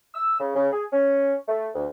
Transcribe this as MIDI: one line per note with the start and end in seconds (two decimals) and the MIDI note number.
0.14 0.39 88
0.40 0.53 49
0.55 0.69 49
0.73 0.85 68
0.92 1.35 61
1.48 1.69 57
1.75 1.88 38